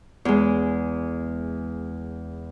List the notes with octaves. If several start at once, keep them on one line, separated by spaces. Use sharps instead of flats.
E2 G#3